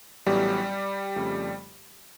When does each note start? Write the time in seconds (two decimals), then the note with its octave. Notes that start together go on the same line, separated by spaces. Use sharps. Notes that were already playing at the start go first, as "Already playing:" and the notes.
0.26 A1 A2 F#3 G3 B3 G4
1.16 F2 C#3 F3 A3